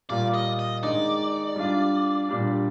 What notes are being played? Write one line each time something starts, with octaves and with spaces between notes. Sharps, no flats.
A#2 G3 A#3 F4 D5
D#5
D#5
D#3 G#3 D#4 D5
G3 D4 F4
A#2 G3 D4